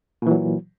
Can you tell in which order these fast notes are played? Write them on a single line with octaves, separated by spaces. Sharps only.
A#2 E3 F#3